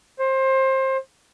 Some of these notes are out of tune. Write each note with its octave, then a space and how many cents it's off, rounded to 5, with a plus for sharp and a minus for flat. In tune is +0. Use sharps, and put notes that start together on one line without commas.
C5 +25